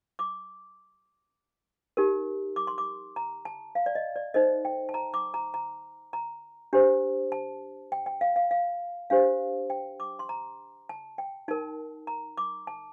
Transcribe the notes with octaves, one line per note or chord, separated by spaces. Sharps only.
D6
D#4 G4 A#4
D6
C6
D6
A#5
A5
F5
D5
D#5
D5
D#4 A4 C5 D#5
G5
A5
A#5
D6
A#5
A#5
A#5
D4 G4 C5
A5
G5
G5
F5
F5
F5
D4 G4 C5 F5
G5
D6
C6
A#5
A5
G5
D#4 A#4 A5
A#5
D6
A5